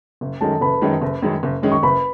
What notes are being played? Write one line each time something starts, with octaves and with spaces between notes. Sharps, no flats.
F#1
F#2 D#3 G#3 C#4 A4 A5
F#1 B4 B5
F#2 D#3 G#3 C#4
F#1
F#2 D#3 G#3 C#4
F#1
F#2 D#3 G#3 C#4
C#6
F#1 B4 B5